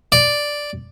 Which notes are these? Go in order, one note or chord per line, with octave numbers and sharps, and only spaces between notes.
D5